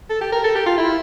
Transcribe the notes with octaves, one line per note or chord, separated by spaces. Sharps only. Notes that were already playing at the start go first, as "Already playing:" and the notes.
A4
G4
A#4
A4
G4
F4
E4